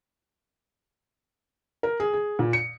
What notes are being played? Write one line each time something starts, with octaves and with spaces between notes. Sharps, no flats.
A#4
G#4
G#4
A#2
C#7